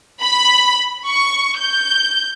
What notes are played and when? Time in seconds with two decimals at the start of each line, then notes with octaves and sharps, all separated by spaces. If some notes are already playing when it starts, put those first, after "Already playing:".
0.21 B5
1.07 C#6
1.58 G6